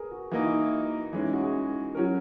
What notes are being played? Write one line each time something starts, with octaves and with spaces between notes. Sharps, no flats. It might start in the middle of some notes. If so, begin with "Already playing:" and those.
Already playing: G#4 A#4 B4
F#4
E3 A#3 D#4 F#4
E4
E3 G#3 C#4 D#4
E4
F#4
G#4
F#3 C#4 F#4 A#4